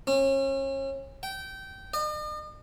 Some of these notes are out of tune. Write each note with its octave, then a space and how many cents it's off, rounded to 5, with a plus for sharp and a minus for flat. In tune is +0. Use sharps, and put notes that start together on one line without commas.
C#4 -35
G5 -20
D#5 -45